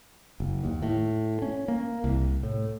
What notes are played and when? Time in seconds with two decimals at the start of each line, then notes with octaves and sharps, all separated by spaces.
0.40 F#1
0.64 D#2
0.82 A2
1.42 C#4
1.68 A#3
2.04 C2
2.43 A2